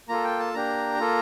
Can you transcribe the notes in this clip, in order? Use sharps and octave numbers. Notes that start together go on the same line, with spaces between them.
A#3 F4 A4 A#5
G5
A5
A#3 D4 G4 A#5
A#3 F4 A4